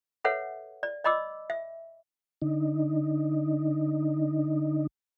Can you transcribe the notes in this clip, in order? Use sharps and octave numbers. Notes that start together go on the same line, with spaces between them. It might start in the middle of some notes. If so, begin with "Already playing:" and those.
A4 B4 C#5 E5 F#5
D5
D5 D#5 B5 D6 E6
E5
D3 D#4